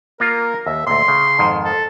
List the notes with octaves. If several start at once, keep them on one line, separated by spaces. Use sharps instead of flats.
A#3 F4 A#4
D#2 E5
D2 A#2 C6
C#3
F2 G#2 D#3
A4